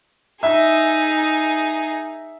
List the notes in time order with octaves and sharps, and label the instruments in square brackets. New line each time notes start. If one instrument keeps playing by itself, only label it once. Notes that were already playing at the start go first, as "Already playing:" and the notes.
[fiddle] D#4 G#4 [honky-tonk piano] E5